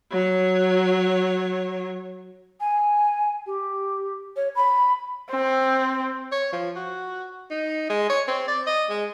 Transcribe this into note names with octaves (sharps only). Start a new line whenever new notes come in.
F#3 C#5
G#5
G4
C#5
B5
C4
C#5
F3
F#4
D#4
G#3
C#5
C4
D5
D#5
G#3